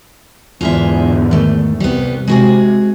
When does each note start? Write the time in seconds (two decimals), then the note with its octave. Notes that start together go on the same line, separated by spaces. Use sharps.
0.61 E2 G#2 D3 F4 G#4 E5
1.31 D#3 A3
1.80 C2 G3 B3
2.28 C3 G#3 F#4 G#4